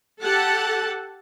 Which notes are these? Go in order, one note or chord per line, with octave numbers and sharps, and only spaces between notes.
G4 A4 F#5 A5